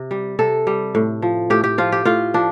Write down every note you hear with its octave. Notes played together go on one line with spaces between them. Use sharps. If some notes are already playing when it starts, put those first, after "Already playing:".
Already playing: C3
G3
C3 A4
G3
A2
F3
A2 G4
G4
F3 F4
G4
A2 F4
F3 D4